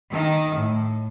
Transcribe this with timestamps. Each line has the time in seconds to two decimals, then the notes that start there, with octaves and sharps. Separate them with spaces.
0.11 D#3
0.54 A2